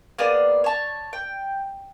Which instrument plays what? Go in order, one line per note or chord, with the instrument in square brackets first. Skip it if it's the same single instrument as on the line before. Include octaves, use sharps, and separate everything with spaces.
[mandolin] A#3 B3 G#4 D5
C#5 A5
G5